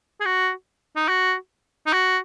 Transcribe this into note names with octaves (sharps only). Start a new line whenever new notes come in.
G#4
F#4
D#4
F#4
D#4
F#4